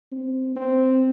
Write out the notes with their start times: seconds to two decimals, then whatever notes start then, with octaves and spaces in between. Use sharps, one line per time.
0.12 C4
0.56 C4